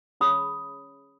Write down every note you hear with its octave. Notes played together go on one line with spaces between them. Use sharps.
C#4 G#4 C#5 B5 D#6